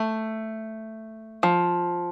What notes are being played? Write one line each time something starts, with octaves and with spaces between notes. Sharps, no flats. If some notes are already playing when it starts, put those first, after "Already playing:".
Already playing: A3
F3